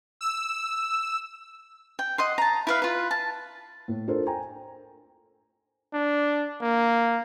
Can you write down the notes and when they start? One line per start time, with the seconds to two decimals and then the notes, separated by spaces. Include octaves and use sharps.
0.21 E6
1.99 G5
2.18 D#5 F#5 C6
2.38 A5 A#5
2.67 E4 B4 F5
2.82 F4 B4
3.11 A5
3.88 A2
4.07 D4 F4 A4 A#4 C5
4.27 G5 G#5 A#5
5.93 D4
6.62 A#3